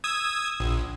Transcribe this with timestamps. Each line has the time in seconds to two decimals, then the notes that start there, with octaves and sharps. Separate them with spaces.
0.04 D#6 E6 G#6
0.60 A#1